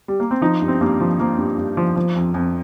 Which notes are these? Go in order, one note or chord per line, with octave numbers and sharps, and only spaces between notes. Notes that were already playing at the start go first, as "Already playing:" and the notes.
G3
A#3
C4
F3 D#4
G2
C4
G2 A#3
F3
F3 A#3
G2
G2
F3
F3
F2
F2